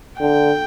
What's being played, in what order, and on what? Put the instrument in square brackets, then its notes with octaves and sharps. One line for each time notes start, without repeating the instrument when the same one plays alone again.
[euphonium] D3 [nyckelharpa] G5